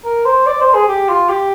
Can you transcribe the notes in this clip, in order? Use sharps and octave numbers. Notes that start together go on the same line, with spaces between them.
A#4
C5
D5
C5
G#4
G4
F4
G4